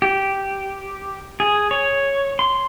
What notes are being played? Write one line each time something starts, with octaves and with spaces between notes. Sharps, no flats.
G4
G#4
C#5
C6